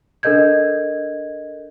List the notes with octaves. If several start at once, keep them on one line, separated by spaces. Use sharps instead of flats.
D4 A4 A#4 D#5 G6 G#6